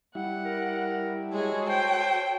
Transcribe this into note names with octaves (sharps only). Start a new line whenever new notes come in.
G3 E4 F#5
A#4
G#3 F#4 G#4 A4 C#5
C5 G5